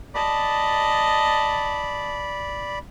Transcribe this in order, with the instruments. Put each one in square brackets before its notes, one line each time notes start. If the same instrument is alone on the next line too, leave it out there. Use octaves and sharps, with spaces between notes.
[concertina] D5 B5 [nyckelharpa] D#5 A5